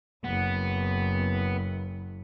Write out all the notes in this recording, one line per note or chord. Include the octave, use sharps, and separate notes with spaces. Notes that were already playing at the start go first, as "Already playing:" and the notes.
F#1 B3